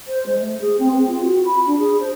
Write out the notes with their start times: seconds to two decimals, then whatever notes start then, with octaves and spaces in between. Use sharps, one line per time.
0.07 C5
0.26 G#3
0.38 A3
0.60 G#4
0.79 C4
0.93 B4
1.07 F4
1.21 F#4
1.45 B5
1.66 D4
1.78 G#4
2.00 C5